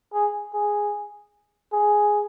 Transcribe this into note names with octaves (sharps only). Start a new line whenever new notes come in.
G#4
G#4
G#4